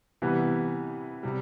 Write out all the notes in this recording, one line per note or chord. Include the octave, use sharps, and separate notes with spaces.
C3 E3 G3 B3
C3 G3